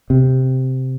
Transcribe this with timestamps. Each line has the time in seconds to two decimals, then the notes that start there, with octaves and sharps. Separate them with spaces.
0.10 C3